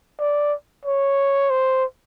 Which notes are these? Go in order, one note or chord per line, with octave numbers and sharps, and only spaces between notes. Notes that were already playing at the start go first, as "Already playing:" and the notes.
D5
C#5
C5